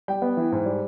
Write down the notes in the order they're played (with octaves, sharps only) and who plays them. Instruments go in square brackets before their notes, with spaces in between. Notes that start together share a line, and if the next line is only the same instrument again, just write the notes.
[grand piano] G3 G5
B3
E3
G#2
G3